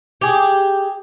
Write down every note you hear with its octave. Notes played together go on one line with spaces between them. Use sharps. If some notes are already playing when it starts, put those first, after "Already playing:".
G4 G#4